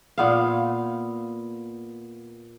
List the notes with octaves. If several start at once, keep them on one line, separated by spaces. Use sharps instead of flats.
A#2 B3 F5